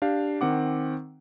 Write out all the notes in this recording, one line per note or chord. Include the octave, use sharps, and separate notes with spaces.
D4 G4 F5
D#3 C4 F#5 D6